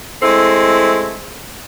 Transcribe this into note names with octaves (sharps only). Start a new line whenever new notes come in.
G#3 A3 C4 E4 A4